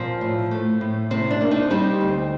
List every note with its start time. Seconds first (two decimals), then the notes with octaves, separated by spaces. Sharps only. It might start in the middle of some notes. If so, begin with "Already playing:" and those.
Already playing: A#2 F3 C4
0.21 A2
0.51 A3
0.81 A2
1.10 C3 C4
1.31 D4
1.41 A#3
1.51 C4 D#4
1.70 G3 C4 D#4
2.01 D2